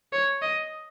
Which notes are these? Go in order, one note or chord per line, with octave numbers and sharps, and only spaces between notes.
C#5
D#5